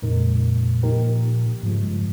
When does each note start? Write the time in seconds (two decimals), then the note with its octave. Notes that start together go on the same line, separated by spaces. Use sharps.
0.02 F2 A#2 C#3 G#3 D#4 A#4
0.83 F3 A#3 D#4 G4 A#4
1.63 G#2 C#3 F3 G#3
1.82 G2